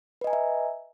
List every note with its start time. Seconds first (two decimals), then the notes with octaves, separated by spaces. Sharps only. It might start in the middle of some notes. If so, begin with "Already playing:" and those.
0.21 B4
0.24 D#5
0.27 G#5
0.30 A#5
0.33 E5